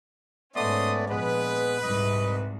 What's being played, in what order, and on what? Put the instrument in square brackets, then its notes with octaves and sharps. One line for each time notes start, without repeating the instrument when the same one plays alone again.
[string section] G#2 C#4 [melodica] A3 B3 D5 [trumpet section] D#5 C6 D#6
[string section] A#1 [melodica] G#3 B3 [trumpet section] B4
[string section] C2 G#2 [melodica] D#5